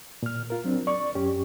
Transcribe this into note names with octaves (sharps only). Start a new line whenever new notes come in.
A#2 F6
F4 A#4
F#3 C4 D4
D5 C#6
F#2 C#4 G4